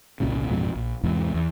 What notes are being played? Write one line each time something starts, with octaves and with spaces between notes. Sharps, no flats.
G1 C2 A#2 C#3
A1 F2 G#2 B2
A#1
E2 G#2 C3
E2